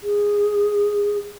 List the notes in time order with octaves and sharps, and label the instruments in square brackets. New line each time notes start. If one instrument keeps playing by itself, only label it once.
[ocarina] G#4